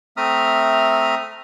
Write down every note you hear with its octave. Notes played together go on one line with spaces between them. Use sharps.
A3 C4 E5 A#5 D#6 F6